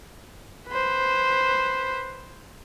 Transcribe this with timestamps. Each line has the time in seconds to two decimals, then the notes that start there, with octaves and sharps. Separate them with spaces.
0.69 B4 C5